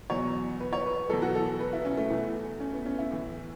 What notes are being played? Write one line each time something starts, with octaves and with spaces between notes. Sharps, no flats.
E2 B2 F#3 C#5
B4
C#5
B4
E2 B2 F#3 A4
F#4
A4
B4
E4
C#4
A3
E2 E3 A3
C#4
B3
C#4
E4
A2 E3